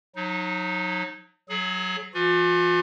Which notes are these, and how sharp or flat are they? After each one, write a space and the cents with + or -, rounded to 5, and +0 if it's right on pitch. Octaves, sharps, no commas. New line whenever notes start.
F#3 -30 D#4 +0
F#3 +0 G#4 +35
E3 +45 F4 +40